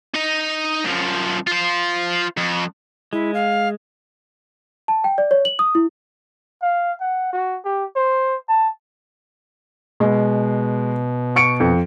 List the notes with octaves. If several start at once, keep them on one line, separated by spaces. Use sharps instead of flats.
D#4 D#5
F#2 F3
F4 C5
F2
G#3 E4
F5
A5
G5
D5
C#5
F#7
D#6
E4
F5
F#5
F#4
G4
C5
A5
B2 G#3
C#6 C#7 D7
F2